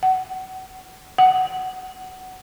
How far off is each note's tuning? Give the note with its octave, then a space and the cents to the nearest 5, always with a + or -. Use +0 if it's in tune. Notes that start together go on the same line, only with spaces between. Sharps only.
F#5 +25
F#5 +10